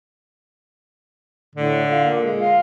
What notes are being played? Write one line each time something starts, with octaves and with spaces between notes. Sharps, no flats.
A2 D3
F4
A#2
G#3
F4